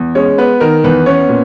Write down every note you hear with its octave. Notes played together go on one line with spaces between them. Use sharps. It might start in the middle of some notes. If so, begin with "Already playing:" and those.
Already playing: E2
G#3 C#4 C#5
B3 B4
D#3 A#4
E2 B4
B3 C#4 C#5
A#2